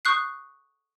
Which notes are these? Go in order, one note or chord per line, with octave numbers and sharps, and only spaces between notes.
C#6 D#6 F#6 G6 C7